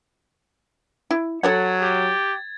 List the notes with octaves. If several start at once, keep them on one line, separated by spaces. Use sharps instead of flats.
E4
F#3 A4 C#5 F#5 G#6 A6
G4